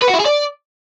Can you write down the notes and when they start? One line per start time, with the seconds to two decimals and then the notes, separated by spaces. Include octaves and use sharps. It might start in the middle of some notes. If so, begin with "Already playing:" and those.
0.02 B4
0.08 F#4
0.14 E4
0.20 G#4
0.25 D5